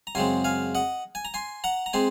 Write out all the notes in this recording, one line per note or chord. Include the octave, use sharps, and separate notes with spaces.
A#5
F#2 C#3 G#3 C4 G#5 C6
F5 G#5
D#5 F#5
G#5
A#5
G#5 C6
F#5 A#5
A#5
G#3 C4 G#5 C6